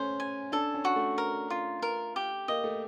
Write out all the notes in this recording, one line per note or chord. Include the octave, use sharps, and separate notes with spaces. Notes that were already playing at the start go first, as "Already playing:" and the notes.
Already playing: A3 C#4 C5
G#5
D4 A4
C#4
F#4
A3
A#4
F4
A#4
G4
A#3 D#5
A3